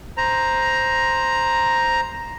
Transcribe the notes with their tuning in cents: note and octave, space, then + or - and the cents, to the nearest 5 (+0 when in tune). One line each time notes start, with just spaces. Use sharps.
C5 +0 A#5 +5